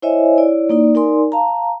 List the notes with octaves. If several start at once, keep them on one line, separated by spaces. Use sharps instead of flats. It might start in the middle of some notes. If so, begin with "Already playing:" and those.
E4 C5 C#5 D#5 E5 G#5
E4 C#5 D5
A#3 D#4 D5
D#4 A#4 D5 G#5 C6
F5 A5 A#5